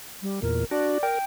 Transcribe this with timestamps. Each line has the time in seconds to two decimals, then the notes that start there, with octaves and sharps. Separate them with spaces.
0.22 G3
0.42 E2 A#2 A#4
0.71 D4 F#4 D5
1.03 A#4 G5